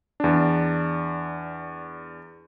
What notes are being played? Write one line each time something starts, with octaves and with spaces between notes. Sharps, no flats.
E2 D4